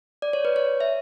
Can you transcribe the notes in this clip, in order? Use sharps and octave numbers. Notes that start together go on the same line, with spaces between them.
D5
C#5
B4
C#5
E5